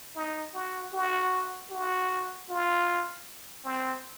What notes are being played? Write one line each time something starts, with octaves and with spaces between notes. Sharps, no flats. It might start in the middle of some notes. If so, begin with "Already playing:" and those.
D#4
F#4
F#4
F#4
F4
C4